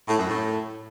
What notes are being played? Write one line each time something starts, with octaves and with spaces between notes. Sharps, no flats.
A2
F#2
A2